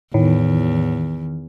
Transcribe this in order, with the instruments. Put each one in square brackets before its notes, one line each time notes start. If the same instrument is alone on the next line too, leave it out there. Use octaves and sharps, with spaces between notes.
[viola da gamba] E2 [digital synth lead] A2 [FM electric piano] D#3